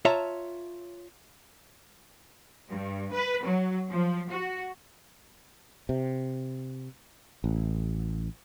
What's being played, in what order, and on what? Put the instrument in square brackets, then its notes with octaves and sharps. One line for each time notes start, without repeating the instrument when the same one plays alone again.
[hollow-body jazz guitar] F4 C#5 E5 A5 A#5
[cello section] G2
B4
F#3
F3
F#4
[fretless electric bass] C3
A1